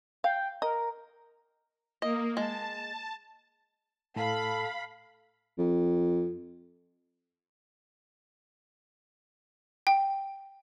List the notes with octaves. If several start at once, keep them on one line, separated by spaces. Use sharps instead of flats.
F5 G5
A#4 D#5
A#3 D#5
G#3 A5
A2 A4 F5 B5
F2
G5